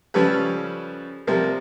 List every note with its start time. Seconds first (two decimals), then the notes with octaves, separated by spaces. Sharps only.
0.14 C#3 F3 G3 C#4 A4 B4
1.27 C3 F3 G3 A#3